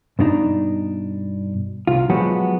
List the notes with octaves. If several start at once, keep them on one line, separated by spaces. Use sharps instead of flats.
G2 B2 D4 D#4
C2 F4
F3 F#3 G#3 B3 F#4 G4